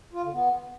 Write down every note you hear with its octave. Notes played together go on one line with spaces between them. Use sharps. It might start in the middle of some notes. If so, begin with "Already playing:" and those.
F4
D3
B3